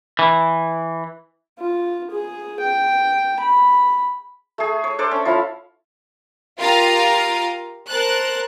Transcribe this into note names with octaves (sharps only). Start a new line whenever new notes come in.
E3
F4
G#4
G5
B5
A3 G#4
C#5
D4 A4 C5 D5
C#4
F3 E4 F5
F4 G4 A#4 F5 A#5 D#6
A#4 C5 A5 F#6